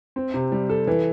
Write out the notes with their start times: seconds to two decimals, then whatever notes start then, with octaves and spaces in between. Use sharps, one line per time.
0.16 C4
0.34 C3
0.52 G3
0.69 A4
0.87 E3